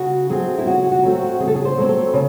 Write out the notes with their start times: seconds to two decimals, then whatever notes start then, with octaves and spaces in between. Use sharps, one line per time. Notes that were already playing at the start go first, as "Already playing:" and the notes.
Already playing: C#3 F#4
0.29 F#3 A3 C4 G#4
0.58 E4
0.66 C#3 F#4
0.92 F#4
1.03 F#3 A3 C4
1.15 F#4
1.40 C#3 G#4
1.48 A4
1.55 G#4
1.65 C5
1.77 F#3 A3 C4
1.89 A4
2.14 C#3